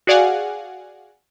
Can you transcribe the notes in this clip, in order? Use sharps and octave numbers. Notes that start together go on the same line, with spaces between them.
F#4 G#4 D5 F5 F#5 G#5